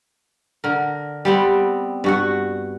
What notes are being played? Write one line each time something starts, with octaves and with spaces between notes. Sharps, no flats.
D3 A#4
G3 B3 C4
G2 F#4 F#5